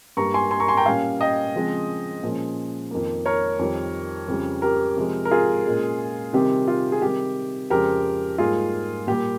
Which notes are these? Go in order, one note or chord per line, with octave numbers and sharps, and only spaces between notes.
G2 G3 A#3 A#5 C#6
G#5 C6
G#5 C6
A#5 C#6
G#5 C6
G5 A#5
A#2 G3 C#4 F5 G#5
D#5 G5
C#3 F3 G#3 C4
A#2 F3 G#3 C#4
F2 D#3 A#3
A#4 C#5
F2 D#3 G3
F2 C#3 G3
G4 A#4
C3 F3 G#3
A#4
F4 G#4
A#2 G#3 C#4
C3 D#3 G3 C4 G4
F4
G#4
C3 D#3 G3 G4
F2 C#3 F3 G#3 G4 A#4
G#2 G3 A#3 F4 G#4
A#2 G3 A#3 G4